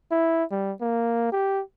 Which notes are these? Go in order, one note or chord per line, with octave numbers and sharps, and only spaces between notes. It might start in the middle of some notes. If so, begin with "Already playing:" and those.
E4
G3
A#3
G4